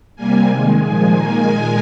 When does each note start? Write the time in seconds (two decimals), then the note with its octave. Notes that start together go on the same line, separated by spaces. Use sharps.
0.16 C3 G3 A#3 G#5
0.47 D#3 G#3
0.78 A#2 F3 G#3 G#5
1.10 D#3 A#3
1.41 A#2 G#3